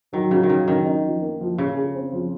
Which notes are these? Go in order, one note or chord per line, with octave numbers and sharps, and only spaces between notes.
D#3 F#3
C#3 F#4
D#3
C#3 F#3
D#3 C#4
D#4
F3
A#3
F3
C#3 G#4
G#4
C4
F3